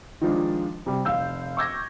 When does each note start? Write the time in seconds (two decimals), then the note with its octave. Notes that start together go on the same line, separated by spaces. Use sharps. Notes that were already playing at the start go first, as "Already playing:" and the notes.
0.21 D#3 F3 G#3 D4
0.86 C3 G3
1.05 F1 F5 E6 G6
1.57 C#6 D6 E6 G6 G#6 A#6